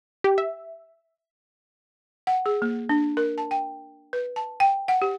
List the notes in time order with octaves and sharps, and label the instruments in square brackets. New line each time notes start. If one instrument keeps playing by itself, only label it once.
[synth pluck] G4
E5
[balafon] F#5
G#4
A#3
D4
A#4
A5
G5
B4
A5
G5
F#5
G4